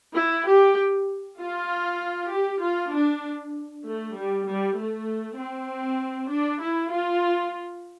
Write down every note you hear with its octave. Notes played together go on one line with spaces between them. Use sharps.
E4
G4
F4
G4
F4
D4
A3
G3
G3
A3
C4
D4
E4
F4